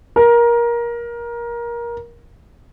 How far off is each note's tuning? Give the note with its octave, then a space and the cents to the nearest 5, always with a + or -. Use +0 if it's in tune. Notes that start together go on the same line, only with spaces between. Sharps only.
A#4 +20